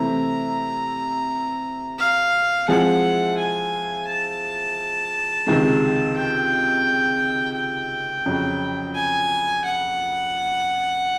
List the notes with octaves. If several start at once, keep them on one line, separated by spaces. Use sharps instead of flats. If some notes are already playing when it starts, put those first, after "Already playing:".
Already playing: C3 E3 A3 C4 E4 A#5
F5
F3 G#3 C4 E4 G#4 F#5
G#5
A5
C#2 C3 D#3 G#3
G5
G5
F2 C#3 F#3
G#5
F#5